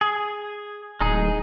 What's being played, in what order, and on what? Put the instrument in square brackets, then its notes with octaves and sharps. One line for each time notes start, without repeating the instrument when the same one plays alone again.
[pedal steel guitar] G#4
[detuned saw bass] D1 [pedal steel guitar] G#3 D#4 G#4